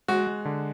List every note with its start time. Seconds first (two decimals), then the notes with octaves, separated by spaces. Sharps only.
0.08 G#3 F#4
0.27 G#3
0.45 D3